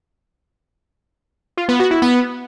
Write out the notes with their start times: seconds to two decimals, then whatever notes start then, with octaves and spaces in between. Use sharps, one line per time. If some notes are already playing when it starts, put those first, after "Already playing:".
1.57 F4
1.69 B3
1.80 F#4
1.91 E4
2.02 B3